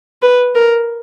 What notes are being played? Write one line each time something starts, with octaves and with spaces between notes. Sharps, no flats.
B4
A#4